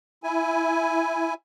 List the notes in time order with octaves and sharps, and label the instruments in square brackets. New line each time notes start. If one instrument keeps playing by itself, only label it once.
[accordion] E4 G#5